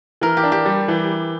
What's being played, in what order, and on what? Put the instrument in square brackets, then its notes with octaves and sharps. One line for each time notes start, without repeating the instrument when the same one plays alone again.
[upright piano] E3 [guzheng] A#4
[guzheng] G4
[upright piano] D4
[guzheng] G4
[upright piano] G3
E3